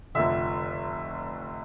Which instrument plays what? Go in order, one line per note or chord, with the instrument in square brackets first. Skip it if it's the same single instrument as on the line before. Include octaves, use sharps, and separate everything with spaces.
[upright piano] F1 F2 D3 E5